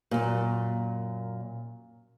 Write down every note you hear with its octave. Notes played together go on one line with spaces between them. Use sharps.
F#2 A#2